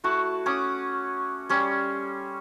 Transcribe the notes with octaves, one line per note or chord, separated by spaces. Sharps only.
A3 E4 F#4 A5
C#4 F#5 D6 D#6
G3 C#4 C6